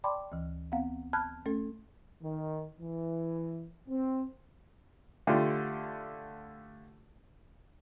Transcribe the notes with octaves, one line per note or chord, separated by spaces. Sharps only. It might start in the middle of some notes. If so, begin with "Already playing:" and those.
D5 G5 A5 B5 C6 D6
D2 E3
B3 C4 F5 F#5
A5 B5 F6 F#6 G#6
A3 C#4 A4
D#3
E3
C4
D3 A3 F4 G4